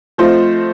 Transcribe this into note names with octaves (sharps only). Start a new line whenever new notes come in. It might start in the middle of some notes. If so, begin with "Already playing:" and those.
F3 A3 C4 F4 C5 D#5